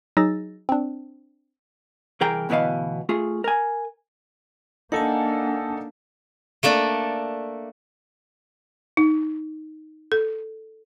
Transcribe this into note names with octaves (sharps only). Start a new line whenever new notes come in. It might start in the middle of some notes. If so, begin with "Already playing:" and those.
F#3 D#4 G#4 E6 A6 A#6
C4 D4
C2 E3 G#4 A#4 G5 A#5
D2 B2 E3 B3 D#5 F5
A3 F4 G#4
A#4 G#5
A#3 D4 D#4 A4 D#5 F#5 G#5 A5
A3 A#3 D4 A4
D#4
A4